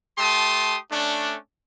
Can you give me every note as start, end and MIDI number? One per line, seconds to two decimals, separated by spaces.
0.18 0.77 57
0.18 0.77 67
0.18 0.77 81
0.18 0.77 84
0.18 0.77 87
0.91 1.35 57
0.91 1.35 61
0.91 1.35 62